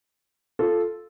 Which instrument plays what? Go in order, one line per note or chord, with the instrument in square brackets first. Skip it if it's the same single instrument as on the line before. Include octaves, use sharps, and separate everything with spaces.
[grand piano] F4 A4